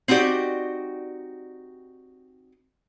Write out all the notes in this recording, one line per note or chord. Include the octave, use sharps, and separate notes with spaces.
C4 D#4 F#4 G4 D5